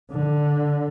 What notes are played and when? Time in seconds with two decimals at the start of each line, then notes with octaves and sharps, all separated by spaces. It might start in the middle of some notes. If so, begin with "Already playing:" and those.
0.12 D3